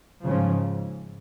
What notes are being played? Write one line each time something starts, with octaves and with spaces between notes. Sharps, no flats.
G#2 C#3 F3